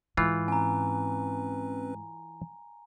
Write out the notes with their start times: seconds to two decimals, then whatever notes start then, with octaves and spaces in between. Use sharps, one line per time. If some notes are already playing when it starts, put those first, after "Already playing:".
0.17 G#2 E3 F4
0.48 C4 C#4 B4 G#5 A#5